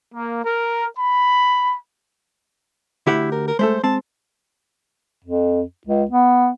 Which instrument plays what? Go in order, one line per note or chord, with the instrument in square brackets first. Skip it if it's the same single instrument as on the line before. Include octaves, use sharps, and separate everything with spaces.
[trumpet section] A#3
A#4
B5
[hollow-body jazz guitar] D2 G4 F#5 [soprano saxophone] E4
[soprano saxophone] A#4
A#4
[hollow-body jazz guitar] G#3 A3 A4 [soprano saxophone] C5
[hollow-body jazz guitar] G#3 C4 [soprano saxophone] A5
[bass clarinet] F2
C#2
B3